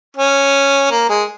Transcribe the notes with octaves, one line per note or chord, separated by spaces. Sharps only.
C#4
A#3
G#3